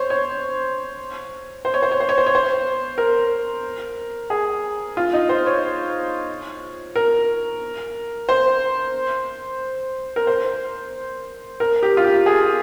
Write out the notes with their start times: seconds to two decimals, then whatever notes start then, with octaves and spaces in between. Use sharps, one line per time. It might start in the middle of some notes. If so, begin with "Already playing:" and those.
Already playing: C5 C#5
0.10 C#5
1.65 C5
1.74 C#5
1.83 C5
1.91 C#5
2.00 C5
2.09 C#5
2.18 C5
2.27 C#5
2.35 C5
2.98 A#4
4.30 G#4
4.97 F4
5.13 D#4
5.29 C5
5.46 C#5
6.96 A#4
8.29 C5
10.16 A#4
10.27 C5
11.60 A#4
11.83 G4
11.97 F4
12.04 G4
12.26 G#4